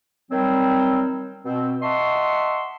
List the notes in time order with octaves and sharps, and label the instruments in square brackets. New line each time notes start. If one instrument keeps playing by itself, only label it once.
[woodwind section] D#3 F#3 G3 C4
B2 C4
D#5 E5 F#5 A5 C6 C#6